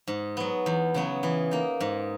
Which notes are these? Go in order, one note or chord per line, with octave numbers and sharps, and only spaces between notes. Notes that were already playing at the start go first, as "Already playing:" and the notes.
G#2
F#3 B3
E2
C#3 F#3 B3
E3
A#3 D#4
G#2